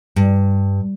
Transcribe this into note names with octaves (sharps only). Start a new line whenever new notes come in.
G2